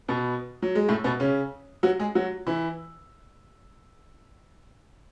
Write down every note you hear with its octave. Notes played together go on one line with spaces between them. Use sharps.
B2 B3
F#3
G#3
A2 A3
B2 B3
C#3 C#4
F#3 F#4
G#3 G#4
F#3 F#4
E3 E4